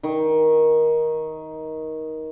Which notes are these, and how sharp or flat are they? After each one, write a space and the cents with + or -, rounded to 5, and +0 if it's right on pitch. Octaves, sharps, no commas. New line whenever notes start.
D#3 +15